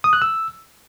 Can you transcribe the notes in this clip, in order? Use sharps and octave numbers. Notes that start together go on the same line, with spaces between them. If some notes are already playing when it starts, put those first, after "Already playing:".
D#6
F#6
E6